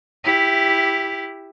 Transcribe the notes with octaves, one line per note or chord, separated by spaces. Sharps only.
E4 G4